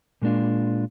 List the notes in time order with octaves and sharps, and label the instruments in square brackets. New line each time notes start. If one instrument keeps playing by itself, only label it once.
[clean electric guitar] A#2 G#3 A#3 D4 F4